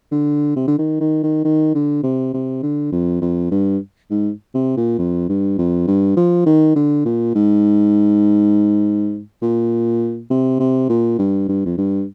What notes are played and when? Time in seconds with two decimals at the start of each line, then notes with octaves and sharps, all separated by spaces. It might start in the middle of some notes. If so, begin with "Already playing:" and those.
0.12 D3
0.56 C3
0.68 D3
0.78 D#3
1.01 D#3
1.23 D#3
1.45 D#3
1.75 D3
2.03 C3
2.34 C3
2.63 D3
2.92 F2
3.22 F2
3.51 G2
4.10 G#2
4.55 C3
4.77 A#2
4.99 F2
5.29 G2
5.58 F2
5.87 G2
6.17 F3
6.46 D#3
6.76 D3
7.05 A#2
7.35 G#2
9.42 A#2
10.30 C3
10.59 C3
10.89 A#2
11.19 G2
11.48 G2
11.66 F2
11.78 G2